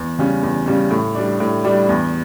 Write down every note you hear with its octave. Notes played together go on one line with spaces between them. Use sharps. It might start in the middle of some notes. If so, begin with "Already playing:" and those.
Already playing: E2
C#3 G3 C#4
E2
C#3 G3 C#4
A2
G3 D4
A2
G3 D4
E2